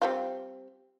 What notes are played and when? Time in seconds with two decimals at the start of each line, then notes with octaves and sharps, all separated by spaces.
0.02 G3 C4 F4